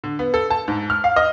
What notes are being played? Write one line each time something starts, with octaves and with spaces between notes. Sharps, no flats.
D3
B3
A4
A5
G#2
F6
F5
D#5